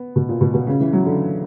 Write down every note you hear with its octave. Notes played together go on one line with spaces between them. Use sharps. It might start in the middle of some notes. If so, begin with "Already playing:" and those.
Already playing: B3
B2
A#2
B2
B2
C#3
E3
F#3
D3